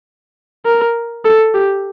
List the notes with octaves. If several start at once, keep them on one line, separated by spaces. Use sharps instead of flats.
A#4
A4
G4